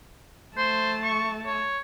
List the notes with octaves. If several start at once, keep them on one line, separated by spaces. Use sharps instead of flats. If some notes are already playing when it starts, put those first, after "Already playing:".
A3 C5 A5
C#6
C#5